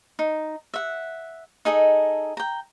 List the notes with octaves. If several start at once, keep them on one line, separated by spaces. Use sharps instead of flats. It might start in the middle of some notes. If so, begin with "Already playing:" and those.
D#4
E5 F#5
D#4 G#4 A4 D#5
G5 A#5